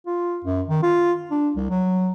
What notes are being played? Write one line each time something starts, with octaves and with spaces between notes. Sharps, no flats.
F4
F#2
D#3
F4
D4
C2
F#3